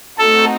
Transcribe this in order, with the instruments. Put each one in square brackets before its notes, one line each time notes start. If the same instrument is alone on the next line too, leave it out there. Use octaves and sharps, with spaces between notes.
[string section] A3 C4 D#4 F#4 [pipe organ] A4